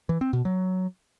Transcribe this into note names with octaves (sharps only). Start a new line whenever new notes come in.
E3
C4
B2
F#3